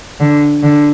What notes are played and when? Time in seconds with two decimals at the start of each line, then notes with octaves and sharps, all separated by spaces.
0.20 D3
0.63 D3